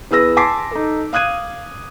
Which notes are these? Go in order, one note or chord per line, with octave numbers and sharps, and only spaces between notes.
E2 G#4 B4 E6 A#6
G#5 A5 C6 D6 B6 C7
D#4 A4
F5 D#6 F#6 G#6 D#7